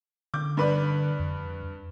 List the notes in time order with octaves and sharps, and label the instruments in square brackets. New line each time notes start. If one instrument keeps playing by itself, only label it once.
[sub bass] D3 [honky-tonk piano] D6 G6
[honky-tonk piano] G2 B4 D5
[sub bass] F2